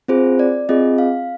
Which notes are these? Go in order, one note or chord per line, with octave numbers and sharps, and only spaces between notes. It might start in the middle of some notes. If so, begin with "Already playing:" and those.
C4 F4 G#4 C5
D5
C4 F4 G#4 D#5
F5